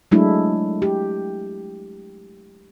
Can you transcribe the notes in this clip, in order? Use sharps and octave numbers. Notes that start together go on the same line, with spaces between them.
F#3 G#3 A3 D4 E4
G4